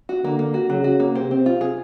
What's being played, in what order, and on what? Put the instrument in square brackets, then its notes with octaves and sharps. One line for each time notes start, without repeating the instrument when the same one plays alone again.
[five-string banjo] F#4
[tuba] D3 [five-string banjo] A#3
[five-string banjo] A#3
F#4
[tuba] C#3 [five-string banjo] F#3
[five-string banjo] F#4
A#3
[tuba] C3 [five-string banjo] C4
[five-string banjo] C4
F4
G#4